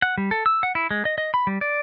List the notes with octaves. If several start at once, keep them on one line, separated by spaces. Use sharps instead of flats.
F#5
G3
A4
E6
F#5
E4
G#3
D#5
D#5
B5
G3
D5